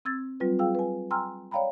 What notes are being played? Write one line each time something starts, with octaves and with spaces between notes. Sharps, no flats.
C4 E6 G#6 A6
F#3 G3 C4 F4 B4
F4 G#4 F5 G5 E6
B4 G#5
G5 G#5 A#5 C6 E6 F6
C#5 D5 F5 G5 A#5 B5